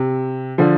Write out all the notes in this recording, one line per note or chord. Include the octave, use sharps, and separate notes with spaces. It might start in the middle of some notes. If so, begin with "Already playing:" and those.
Already playing: C3
D3 F3